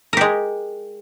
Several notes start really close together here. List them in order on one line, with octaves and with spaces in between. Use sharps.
A#4 G4 G#3